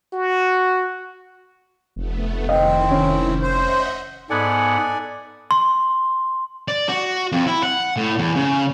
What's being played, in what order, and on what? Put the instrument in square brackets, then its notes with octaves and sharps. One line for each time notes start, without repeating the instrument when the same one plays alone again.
[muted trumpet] F#4
[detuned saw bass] F1 [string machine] A3 B3
[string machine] D#3 E4 [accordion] C4 [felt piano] D#5
[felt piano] C#4
[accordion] C5 [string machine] D#5 E5 F#5
[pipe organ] G#2 B3 F#5 [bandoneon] A4 D5 G#5
[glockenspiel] C6
[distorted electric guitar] D5
F#4
F2
E4
F#5
A2
E2
C#3